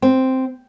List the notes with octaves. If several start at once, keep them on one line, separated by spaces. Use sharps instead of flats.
C4